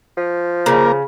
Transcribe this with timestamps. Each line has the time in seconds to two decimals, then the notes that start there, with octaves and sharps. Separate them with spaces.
0.17 F3
0.66 C#3 A#3 A#4